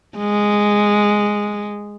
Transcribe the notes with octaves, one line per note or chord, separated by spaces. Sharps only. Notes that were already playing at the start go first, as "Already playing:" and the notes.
G#3